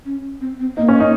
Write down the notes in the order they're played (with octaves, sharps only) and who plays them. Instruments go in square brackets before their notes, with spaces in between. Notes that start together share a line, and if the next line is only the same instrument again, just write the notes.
[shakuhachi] C#4
C4
C4
[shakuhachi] A#3 [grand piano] D#4
[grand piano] C#4
D#4